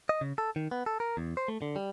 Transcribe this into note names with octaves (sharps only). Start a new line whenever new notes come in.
D#5
C#3
A4
D#3
B3
A4
A#4
E2
C5
A3
D3
G3